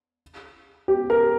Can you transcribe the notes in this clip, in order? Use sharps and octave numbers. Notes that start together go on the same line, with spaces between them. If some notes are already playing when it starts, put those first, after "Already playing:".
G4
A#4